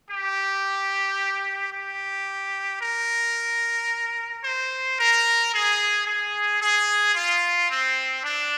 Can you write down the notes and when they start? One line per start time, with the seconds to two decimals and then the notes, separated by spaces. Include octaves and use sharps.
0.11 G4
1.73 G4
2.82 A#4
4.44 C5
4.99 A#4
5.53 G#4
6.06 G#4
6.61 G#4
7.15 F4
7.70 C4
8.23 D4